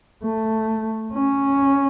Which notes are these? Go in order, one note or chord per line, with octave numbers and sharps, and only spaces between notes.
A3
C#4